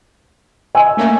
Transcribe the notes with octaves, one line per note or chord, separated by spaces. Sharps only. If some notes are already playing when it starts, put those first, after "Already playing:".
D#5 G#5 E6
A3 A#3 C#4